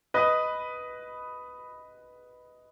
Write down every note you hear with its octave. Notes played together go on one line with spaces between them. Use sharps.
B4 D#5